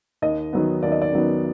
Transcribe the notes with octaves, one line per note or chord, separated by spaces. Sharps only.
D#2 D#5
D#3 F#3 B3
D#2 D5
D#5
D5
D#3 F#3 B3